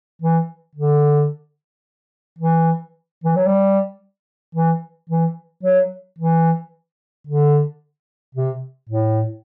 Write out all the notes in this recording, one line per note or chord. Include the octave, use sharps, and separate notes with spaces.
E3
D3
E3
E3
F#3
G3
E3
E3
F#3
E3
D3
C3
A2